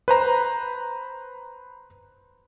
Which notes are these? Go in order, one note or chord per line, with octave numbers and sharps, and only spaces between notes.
B4 C5 A#5